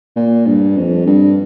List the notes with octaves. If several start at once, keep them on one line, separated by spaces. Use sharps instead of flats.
A#2
G2
F2
G2